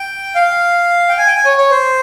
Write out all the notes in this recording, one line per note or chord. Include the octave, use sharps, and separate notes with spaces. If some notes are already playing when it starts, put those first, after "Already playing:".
Already playing: G5
F5
G5
G#5
G5
G#5
C#5
C#5
C5